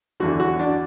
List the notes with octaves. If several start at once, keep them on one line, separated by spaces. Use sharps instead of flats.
E2 D3 F#4
F#4
D4